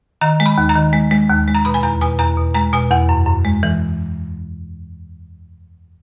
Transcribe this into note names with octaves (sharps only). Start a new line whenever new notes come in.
D#3 A#5
G#3
B5
D#2
A#5
D#3
G#3
G#3
D#2
G#3
A#5
B2 B5
G#5
E2 A#5
B2 G#5
E2 A#5
B2
G#3 A#5
B2 G#5
E2 F#5
F#2
F#2
G#3
E3